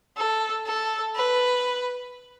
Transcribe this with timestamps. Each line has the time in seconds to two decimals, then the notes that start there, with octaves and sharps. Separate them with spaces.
0.17 A4
0.66 A4
1.16 B4